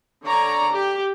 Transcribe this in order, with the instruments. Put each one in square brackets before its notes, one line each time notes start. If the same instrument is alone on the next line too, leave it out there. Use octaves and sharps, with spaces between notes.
[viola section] D3 C#5 D5 A#5
G4